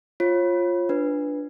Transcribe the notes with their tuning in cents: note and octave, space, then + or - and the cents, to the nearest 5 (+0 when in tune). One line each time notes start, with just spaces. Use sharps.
F4 +0 C#5 -35
D4 +0 B4 -5